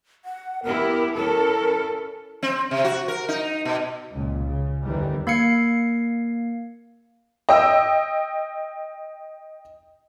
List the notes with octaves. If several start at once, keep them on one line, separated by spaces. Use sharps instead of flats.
F#5
B3 E4 G4 A#4
C#4 E4 A4 A#4
C4
C3
F#4
A#4
D#4
B2
C#2 A#2
C#3
G1 E2 D#3 E3 G3
A#3 F5 G#6 C7 C#7
D#5 G5 E6